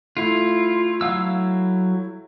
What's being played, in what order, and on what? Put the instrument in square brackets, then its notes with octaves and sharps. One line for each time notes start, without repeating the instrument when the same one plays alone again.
[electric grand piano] A3 E4 [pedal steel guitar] F4
[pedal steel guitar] F#3 F5 E6